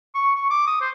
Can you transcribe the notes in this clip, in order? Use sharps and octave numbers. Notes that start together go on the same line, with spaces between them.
C#6
C#6
D6
D#6
C5